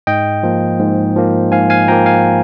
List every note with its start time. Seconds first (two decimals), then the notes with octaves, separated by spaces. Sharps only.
0.07 G#2 D#5 G5
0.43 F3 A#3
0.79 G#2
1.16 F3 A#3
1.52 G#2 F5 G#5
1.70 F5 G#5
1.88 F3 A#3 G5 A#5
2.06 F5 G#5